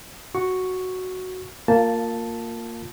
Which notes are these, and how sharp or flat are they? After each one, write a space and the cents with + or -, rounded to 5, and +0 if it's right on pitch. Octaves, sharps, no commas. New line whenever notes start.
F#4 +0 C#6 +0
A#3 -15 F4 +10 A5 +0